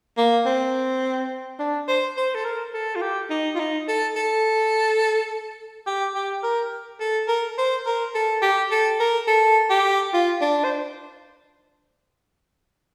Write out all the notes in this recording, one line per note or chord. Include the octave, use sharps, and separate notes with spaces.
A#3
C4
D4
C5
C5
A4
A#4
A4
F4
G4
D#4
F4
D#4
A4
A4
G4
G4
A#4
A4
A#4
C5
A#4
A4
G4
A4
A#4
A4
G4
F4
D4
C5